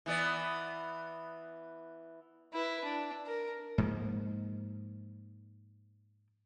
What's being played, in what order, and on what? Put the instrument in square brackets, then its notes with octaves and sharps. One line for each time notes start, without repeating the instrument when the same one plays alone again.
[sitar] E3 B3 D5
[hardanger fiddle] E4 B4
D4
A#4
[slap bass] G#2 F3 A#3